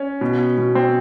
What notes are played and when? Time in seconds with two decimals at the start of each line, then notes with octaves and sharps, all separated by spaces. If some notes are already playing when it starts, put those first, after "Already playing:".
Already playing: C#4
0.21 B2
0.58 B2
0.75 C4